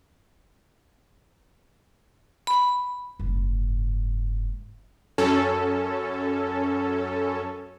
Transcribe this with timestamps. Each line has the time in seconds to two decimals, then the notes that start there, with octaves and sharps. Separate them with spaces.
2.47 B5
3.19 F#1 G#2
5.18 F#2 C#4 A4